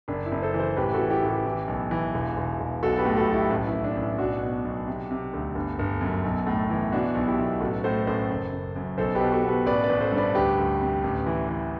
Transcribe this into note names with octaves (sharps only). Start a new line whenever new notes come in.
F#1 D4
E4
F#1
A4 C5
E3
A4 C5
A1 G4 B4
F#4 A4
E3
E4 G4
A1
E4 G4
E3
B1
E3
E1
E1
E1
B1 F#4 A4
G4 B4
A2
F#4 A4
B1
E4 G4
A1
E4
A1
D4
A1
E4
B1 D4 F#4
B2
B1
C3
C3
D2
G1
G1
F#2
B1
A2
E3
B2 D4 F#4
B1
E4 G4
B1
A1 F#4 A4
A2 A4 C5
A1 A4 C5
F#1
F#1
F#2
B1 A4 C5
G4 B4
B2
F#4 A4
B2
G4 B4
A1 B4 D5
B4 D5
A1
A4 C5
G2
B4 D5
D2 G4 B4
D2
C3
A1
E3
E3